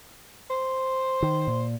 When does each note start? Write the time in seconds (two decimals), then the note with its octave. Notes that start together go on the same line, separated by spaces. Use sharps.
0.50 C5
1.22 D#3
1.47 A#2